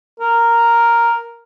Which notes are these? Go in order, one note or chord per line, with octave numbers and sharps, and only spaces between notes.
A#4